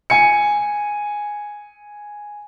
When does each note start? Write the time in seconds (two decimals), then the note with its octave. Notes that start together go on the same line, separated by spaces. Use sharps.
0.10 G#5 C#7